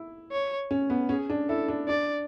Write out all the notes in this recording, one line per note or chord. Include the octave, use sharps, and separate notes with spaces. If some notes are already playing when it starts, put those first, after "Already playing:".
Already playing: E4
C#5
C#4
B3
C#4 G#4
D4
E4 A4
D4
D4 D5